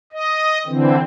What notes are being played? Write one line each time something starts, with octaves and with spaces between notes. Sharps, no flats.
D#5
D3 E3 C4